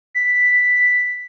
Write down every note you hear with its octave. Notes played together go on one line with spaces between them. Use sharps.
B6